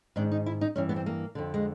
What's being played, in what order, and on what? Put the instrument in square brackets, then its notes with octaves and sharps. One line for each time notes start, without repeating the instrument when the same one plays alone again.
[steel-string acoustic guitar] G#2 D#3 D4
D#4
E4
D#4
G2 E3 C#4
B3
C4
A#3
F2 D3
G#3